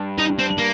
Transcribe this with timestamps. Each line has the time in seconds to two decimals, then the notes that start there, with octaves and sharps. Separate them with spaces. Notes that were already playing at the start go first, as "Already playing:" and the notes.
Already playing: G2
0.18 D#4
0.39 C4
0.58 A#3